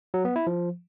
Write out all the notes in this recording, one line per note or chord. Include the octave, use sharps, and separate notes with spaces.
F#3
B3
E4
F3